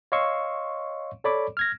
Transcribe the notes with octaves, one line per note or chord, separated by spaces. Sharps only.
C#5 D#5 F5 C6 C#6 E6
A4 C#5 D5 B5 D6
F6 G#6 A#6